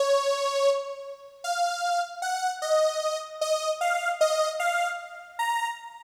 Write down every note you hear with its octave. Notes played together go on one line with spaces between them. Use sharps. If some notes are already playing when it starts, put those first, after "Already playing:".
Already playing: C#5
F5
F#5
D#5
D#5
F5
D#5
F5
A#5